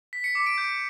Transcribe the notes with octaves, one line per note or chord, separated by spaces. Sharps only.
B6
C#7
D6
D7
G6